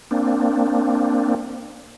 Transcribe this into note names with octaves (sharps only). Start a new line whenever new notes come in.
A#3 C4 D4